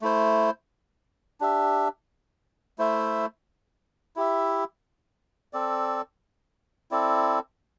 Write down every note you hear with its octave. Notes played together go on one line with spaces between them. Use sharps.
A3 E4 C5
D4 G4 E5
A3 E4 C5 E5
E4 G4 E5
C4 A4 D5
C4 E4 A4 D5